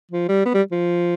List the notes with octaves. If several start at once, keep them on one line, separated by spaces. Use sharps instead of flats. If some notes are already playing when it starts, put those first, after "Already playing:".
F3
G3
B3
G3
F3